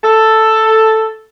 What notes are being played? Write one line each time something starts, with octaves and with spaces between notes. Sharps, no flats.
A4